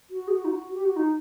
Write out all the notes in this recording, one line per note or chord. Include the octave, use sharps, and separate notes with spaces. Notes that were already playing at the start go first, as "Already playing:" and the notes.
F#4
G#4
F#4
D#4
F#4
G4
F#4
D#4